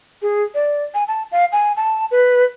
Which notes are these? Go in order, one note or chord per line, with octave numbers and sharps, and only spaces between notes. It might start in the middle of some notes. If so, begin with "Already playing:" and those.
G#4
D5
G#5
A5
F5
G#5
A5
B4